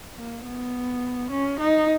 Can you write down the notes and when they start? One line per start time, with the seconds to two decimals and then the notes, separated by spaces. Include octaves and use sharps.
0.18 A#3
0.45 B3
1.31 C#4
1.60 D#4